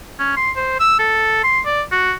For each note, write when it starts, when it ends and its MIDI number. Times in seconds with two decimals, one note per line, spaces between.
0.19 0.35 61
0.37 0.51 84
0.56 0.79 72
0.80 0.97 88
0.99 1.43 69
1.44 1.60 84
1.66 1.82 74
1.92 2.13 66